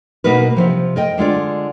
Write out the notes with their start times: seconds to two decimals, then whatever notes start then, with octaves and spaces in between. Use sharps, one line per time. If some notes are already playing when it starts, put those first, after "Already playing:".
0.24 B2 A#3 D#4 A#4 B4
0.56 C3 D#3 F3
0.96 A#4 D#5 G5
1.18 D3 G#3 F4 D5